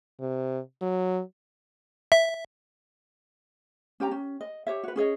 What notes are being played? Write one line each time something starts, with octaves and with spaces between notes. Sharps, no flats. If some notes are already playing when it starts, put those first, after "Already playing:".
C3
F#3
E5
C#4 G4 G5 A#5
C#4
D#5
G4 C#5 E5
F#4 B4
C#4 G#4 C#5 D#5